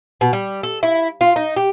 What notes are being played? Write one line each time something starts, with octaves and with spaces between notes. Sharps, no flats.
B2
G3
A4
E4
F4
D#4
G4